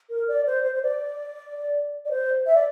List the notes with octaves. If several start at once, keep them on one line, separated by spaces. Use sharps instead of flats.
A#4
D5
C5
C5
C5
D5
D5
C5
E5
D5